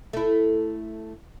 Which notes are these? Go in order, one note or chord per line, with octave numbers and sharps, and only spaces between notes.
A3 E4